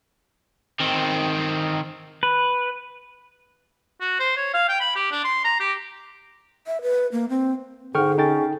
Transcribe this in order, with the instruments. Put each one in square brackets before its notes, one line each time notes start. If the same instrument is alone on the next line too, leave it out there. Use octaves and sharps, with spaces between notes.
[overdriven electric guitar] D#3 C4
[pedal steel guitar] B4
[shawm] F#4
C5
C#5
F5
G5
B5
G4
D4
C6
A#5
G4
[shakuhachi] E5
B4
A#3
C4
[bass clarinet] G#2 [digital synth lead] D3 [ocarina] G#4 [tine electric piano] G5 C#6 F6
[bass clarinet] C#4 [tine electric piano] D#4 G5 A6